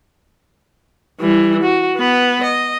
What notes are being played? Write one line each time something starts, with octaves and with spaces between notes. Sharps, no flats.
E3 G3
F#4
B3 B4
D#5